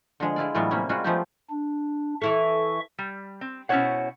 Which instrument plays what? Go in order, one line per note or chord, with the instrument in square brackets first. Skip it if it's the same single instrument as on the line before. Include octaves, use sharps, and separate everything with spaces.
[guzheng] D3 F3 G#3
G#3 E4 F4 D5
A2 E3 F#3 G3 B3 F4
C3 G3 A#3 C#4
G3 G#3 C#4 F4 F#4
F3 G#3 A3 B3 D#4 G4
[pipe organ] D4
[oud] E3 E4 A4 [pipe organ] E5 C#6
[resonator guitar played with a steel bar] G3
C4
B2 C#4 E4 C5 C#5 F#5